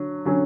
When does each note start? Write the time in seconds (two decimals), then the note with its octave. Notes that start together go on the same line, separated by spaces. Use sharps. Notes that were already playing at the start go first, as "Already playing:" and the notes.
Already playing: D3 F#3
0.25 D3 F#3 C#4